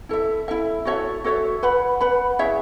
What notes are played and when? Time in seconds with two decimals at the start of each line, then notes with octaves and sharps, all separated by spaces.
0.09 E4 A4 E5
0.48 E4 A4 E5
0.85 F#4 A4 C#5 E5
1.24 F#4 A4 C#5 E5
1.63 B4 F#5 B5
2.01 B4 F#5 B5
2.39 E4 G#4 C#5 E5